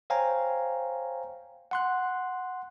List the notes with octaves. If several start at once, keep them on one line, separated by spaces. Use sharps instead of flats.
C5 C#5 F5 G5 G#5 A#5
F#5 C6 F#6